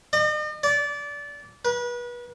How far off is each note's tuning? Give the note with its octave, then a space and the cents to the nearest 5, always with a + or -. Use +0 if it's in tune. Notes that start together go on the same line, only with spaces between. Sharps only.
D#5 -45
D5 -20
B4 -35